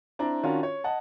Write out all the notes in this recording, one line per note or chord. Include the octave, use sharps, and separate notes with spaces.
C4 D4 E4 D5 A#5
D#3 C#4 D4 F4 F#4 A#4
C#5
D#5 F#5 A5